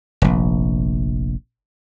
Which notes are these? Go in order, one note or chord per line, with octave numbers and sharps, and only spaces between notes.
F1 A#1